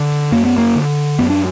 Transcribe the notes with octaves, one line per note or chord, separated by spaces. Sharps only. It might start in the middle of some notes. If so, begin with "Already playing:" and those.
Already playing: D3
F#2 A#3
B3
A#3
D3
F#2 B3
D4